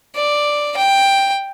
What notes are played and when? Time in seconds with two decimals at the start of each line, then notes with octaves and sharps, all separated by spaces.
0.16 D5
0.77 G5